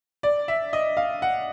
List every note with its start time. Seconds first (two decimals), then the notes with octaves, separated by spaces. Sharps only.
0.23 D5
0.48 E5
0.73 D#5
0.97 F5
1.22 F#5